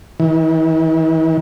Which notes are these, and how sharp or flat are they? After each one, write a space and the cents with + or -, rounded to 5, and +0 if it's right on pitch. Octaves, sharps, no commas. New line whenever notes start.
E3 -45